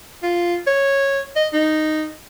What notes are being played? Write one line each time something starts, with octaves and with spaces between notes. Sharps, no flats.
F4
C#5
D#5
D#4